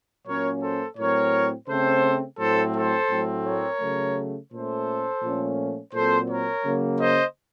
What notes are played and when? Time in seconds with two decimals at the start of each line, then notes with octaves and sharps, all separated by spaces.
0.26 A#2 F#3 A#3 C#4 A#4 C#5
0.62 A4 C5
0.97 A2 F#3 C4 A#4 C#5
1.68 C#3 A3 C4 A4 C5
2.39 A2 F#3 A3 C4 A4 C5
2.75 A4 C5
3.10 A2 F#3 A3 C4
3.46 A#4 C#5
3.81 C#3 F#3 A3
4.52 A#2 A3 C#4 A4 C5
5.22 A#2 F3 A3 C#4
5.93 A#2 F#3 C4 A4 C5
6.29 A#4 C#5
6.64 C#3 F#3 A#3
7.00 C5 D#5